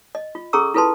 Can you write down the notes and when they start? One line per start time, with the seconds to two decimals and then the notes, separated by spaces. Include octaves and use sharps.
0.15 D#5
0.35 F4
0.53 C#4 G#4 A4 A#5 C#6 E6
0.74 E4 F4 A4 B4 A5 C6